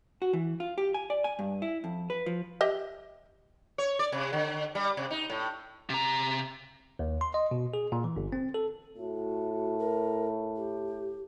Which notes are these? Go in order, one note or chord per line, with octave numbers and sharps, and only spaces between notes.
F#4
E3
F4
G4
G#5
D5
G#5
G2
E4
F2
B4
F3
G4 D#5 E5
C#5
D5
C3
D3
G3
C3
D#4
A2
C3 A#5
D#2
C6
D#5
B2
G#4
A#2
E3
G1
C4
A4
A2 F#4
A#4
G4